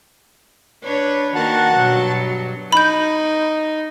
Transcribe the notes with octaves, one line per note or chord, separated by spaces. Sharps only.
D4 B4 C#5
D#3 A#3 F#4 A#4 F#5 A5
G2 B2 F#3
D#4 B5 G6